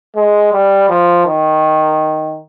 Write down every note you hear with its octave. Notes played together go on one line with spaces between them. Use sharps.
G#3
G3
F3
D#3